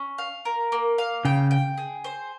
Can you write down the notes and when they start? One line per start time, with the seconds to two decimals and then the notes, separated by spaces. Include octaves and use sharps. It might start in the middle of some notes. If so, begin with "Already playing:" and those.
Already playing: C#4
0.18 F5
0.45 A#4
0.72 A#3
0.98 F5
1.25 C#3 G5
1.51 G5
1.78 G#4
2.04 C5